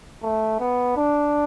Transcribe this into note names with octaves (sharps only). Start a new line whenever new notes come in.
A3
B3
D4